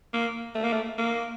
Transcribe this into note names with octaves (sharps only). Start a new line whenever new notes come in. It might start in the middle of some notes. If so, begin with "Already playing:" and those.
A#3
A3
A#3
A3
A#3